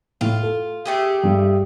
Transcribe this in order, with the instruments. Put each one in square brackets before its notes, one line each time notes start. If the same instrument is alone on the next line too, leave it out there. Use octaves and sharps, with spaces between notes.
[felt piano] A2 [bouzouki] F4
[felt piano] A4
[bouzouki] A3 G4 G#4
[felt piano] G2